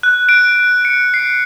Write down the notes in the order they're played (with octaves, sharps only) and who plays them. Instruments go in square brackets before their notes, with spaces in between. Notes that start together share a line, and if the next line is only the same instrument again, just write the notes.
[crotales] F#6
D7
C#7
C7